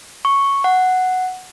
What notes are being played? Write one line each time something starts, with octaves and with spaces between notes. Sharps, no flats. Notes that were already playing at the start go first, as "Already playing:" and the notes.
C#6
F#5